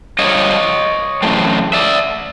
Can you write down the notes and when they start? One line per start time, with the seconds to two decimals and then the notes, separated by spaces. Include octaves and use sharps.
0.19 G2 D3 F3 C#5 D#5
1.22 F#2 C#3 E3 A3 C4
1.73 D5 E5